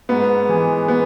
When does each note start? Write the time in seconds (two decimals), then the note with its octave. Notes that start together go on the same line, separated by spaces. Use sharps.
0.09 G#2 B3
0.49 E3 G#3
0.88 B3